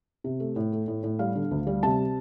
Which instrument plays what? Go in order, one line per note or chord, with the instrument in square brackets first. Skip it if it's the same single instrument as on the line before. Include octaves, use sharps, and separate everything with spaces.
[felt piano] C3
A3
A2
A3
A2
A2
G3 F5
D3
D2
G3
C3 A5